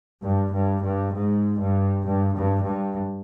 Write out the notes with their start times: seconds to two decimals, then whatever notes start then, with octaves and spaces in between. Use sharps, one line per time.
0.23 G2
0.53 G2
0.83 G2
1.13 G#2
1.59 G2
2.04 G2
2.34 G2
2.65 G2